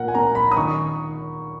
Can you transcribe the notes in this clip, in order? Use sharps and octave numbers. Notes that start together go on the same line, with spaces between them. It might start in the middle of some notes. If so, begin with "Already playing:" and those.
Already playing: A#2 A#4 F#5
G#5
A#3 C#4 A#5
B5
D#6
D#3 C#6